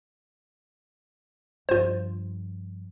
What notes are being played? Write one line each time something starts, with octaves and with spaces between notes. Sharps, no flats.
G2 F3 F4 C5